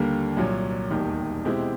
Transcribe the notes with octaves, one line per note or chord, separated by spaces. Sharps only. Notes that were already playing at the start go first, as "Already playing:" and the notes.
Already playing: D#2 D3 G3 A#3
C2 A#2 F#3
E1 D#2 D#3 G3
B2 G#3 C4 E4 G4